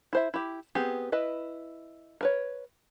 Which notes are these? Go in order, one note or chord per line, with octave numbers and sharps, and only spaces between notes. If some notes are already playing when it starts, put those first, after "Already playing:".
E4 C5 E5
E4 G4
B3 C4 G4 G#4
E4 B4 D#5
A#4 B4 C#5